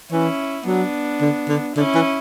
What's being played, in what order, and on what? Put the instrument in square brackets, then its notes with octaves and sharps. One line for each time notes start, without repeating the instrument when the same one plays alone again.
[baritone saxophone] E3 [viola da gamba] C#4 E4
[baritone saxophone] F#3 [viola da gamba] B3 D4
[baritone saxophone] D3
D3
[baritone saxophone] D3 [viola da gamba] C#4 E4
[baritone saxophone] E3